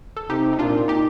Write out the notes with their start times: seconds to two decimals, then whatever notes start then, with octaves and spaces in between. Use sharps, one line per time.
0.17 A4
0.30 C3 D#4 G4
0.53 D#4
0.59 A#2 D4 F4
0.88 D#4 G4